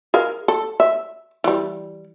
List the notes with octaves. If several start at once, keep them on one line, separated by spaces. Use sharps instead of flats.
G#4 A#4 F5
A4
E5
E3 G3